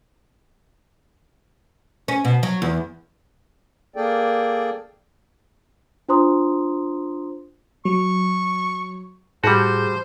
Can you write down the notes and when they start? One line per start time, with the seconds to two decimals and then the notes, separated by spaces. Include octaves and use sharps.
2.08 C#4
2.25 B2
2.43 F#3
2.62 E2
3.96 A#3 G#4 A4 D5 G5
6.09 D4 F4 C5 A#5 C6 D#6
7.85 F#3 C#6
9.44 A2 G3 F#4 G#4 C5 A5